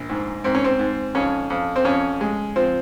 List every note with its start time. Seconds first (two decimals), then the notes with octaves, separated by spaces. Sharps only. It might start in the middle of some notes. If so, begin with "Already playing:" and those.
Already playing: A#1
0.09 G#2
0.44 G#2 C4
0.55 C#4
0.64 C4
0.79 G#2
1.15 F2 C#4
1.50 F2
1.76 C4
1.85 F2 C#4
2.21 G#3
2.56 F3 C4